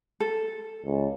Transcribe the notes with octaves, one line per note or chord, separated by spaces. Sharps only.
A4
C#2